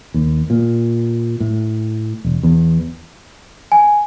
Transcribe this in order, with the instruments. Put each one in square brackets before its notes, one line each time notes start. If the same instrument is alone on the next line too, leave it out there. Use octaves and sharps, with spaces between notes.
[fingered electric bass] D#2
A#2
A2
E1
E2
[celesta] G#5